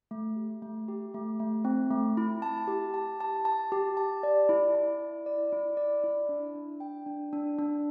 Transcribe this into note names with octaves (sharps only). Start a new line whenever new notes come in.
A3
G4
A3
G4
A3
A3
C4
A3
E4
A5
G4
A5
A5
A5
G4
A5
D5
E4
E4
D5
D5
E4
D5
E4
D4
D4
G5
D4
D4
D4